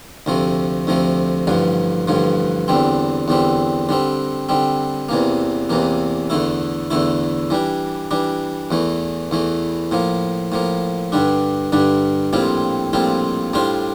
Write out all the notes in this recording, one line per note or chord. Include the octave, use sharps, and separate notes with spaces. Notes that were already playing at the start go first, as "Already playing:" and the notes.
D2 C3 F3 A3
D2 C3 F3 A3
A1 G2 D3 F3
A1 G2 D3 F3
E2 D3 G3 C4
E2 D3 G3 C4
D3 G3 C4
D3 G3 C4
E2 C3 E3 A#3
E2 C3 E3 A#3
E2 D3 A3 E4
E2 D3 A3 E4
E3 G3 D4
E3 G3 D4
E2 E3 A3
E2 E3 A3
A2 F3 A#3
A2 F3 A#3
G2 D3 G3 D4
G2 D3 G3 D4
A#1 A2 G3 C4 F4
A#1 A2 G3 C4 F4
A2 G3 D4 F4 C5